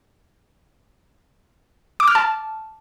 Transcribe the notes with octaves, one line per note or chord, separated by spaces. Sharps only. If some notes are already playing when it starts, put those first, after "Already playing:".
D6
F6
A5